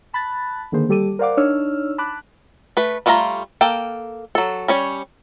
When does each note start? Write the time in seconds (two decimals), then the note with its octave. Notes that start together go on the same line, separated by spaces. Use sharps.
0.13 A5 B5 F#6 A6
0.72 D3 D#3 A#3 G#4 C5
0.89 G3 G4 A4 D6 D#7
1.19 A#4 C5 D5 F5 F#5 D6
1.37 D4 D#4 C#5 E6 F6
1.98 A5 B5 D6 F#6
2.77 A3 B4
3.06 G3 A3 F4 A4 A#5
3.61 A#3 A4 G5
4.35 F#3 A4
4.68 G3 C#4 C#5